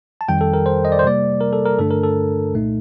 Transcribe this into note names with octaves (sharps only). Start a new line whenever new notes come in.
A5
F2 D#3 G3 G5
A4
A#4
C5
D#5
D5
C5
C3 G3 A#3 D5
A#4
A4
A#4
G2 D3 A3 D4 A4
A#4
A4
C2 A#2 A3 D#4